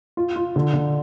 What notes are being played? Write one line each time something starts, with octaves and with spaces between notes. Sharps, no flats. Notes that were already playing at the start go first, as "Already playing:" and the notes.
F4
F4
D3
D3